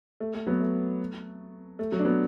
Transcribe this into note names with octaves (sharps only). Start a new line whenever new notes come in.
A3
A3
F#3 B3
A3
A3
F#3
D4
F#3 B3